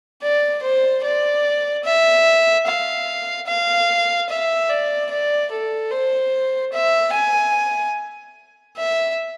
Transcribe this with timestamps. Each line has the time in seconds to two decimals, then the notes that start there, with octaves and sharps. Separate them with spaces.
0.22 D5
0.63 C5
1.03 D5
1.84 E5
2.67 F5
3.47 F5
4.29 E5
4.69 D5
5.11 D5
5.51 A4
5.91 C5
6.73 E5
7.14 G#5
8.77 E5